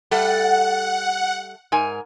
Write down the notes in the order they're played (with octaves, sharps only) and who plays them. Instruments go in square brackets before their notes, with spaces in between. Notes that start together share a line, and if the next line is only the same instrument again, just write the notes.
[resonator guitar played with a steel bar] G3 A3 A4 [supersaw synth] F#5
[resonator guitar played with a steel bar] G#2 A#4 G#5